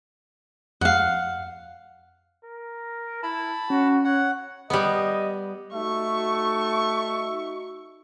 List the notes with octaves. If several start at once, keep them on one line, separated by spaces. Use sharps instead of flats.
F2 F5 F#5
A#4
E4 A5 B5
C#4 F#4
C#5 F#5
G3 B3 D#5
A3 D#4 F#4 E5 C#6